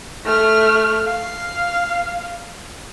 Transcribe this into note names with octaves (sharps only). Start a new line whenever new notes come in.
A3 F6
F5